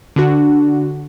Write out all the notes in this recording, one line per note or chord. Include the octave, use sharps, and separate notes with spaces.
D3 D4 F#4